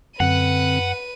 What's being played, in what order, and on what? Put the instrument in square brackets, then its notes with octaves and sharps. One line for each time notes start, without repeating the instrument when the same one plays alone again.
[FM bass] F#2 [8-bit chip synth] D3 C4 [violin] B4 D#7 [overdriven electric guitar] F#5